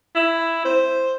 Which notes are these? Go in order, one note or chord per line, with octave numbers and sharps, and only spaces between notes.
E4
C5